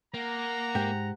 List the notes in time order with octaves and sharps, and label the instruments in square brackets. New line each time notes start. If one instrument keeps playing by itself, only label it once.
[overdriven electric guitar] A#3 [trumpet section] F#5 A#5
[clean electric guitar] G#2 [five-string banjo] G4